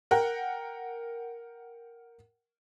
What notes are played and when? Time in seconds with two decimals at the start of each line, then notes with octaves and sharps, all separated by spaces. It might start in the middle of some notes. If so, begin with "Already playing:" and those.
0.11 A#4 F#5 G5